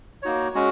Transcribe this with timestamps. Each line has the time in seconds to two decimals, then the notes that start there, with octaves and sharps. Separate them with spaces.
0.23 A#3 D#4 F#4 C#5
0.54 G#3 C#4 F#4